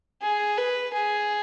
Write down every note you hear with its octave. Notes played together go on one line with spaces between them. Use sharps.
G#4
B4
G#4